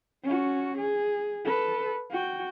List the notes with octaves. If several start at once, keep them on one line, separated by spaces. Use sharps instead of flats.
C#4 F#4
G#4
A4 B4
F#4 G5